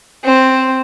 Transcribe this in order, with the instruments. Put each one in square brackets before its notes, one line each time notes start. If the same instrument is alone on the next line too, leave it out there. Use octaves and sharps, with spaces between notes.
[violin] C4